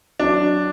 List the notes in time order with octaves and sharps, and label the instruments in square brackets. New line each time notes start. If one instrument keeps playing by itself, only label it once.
[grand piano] F#3 D4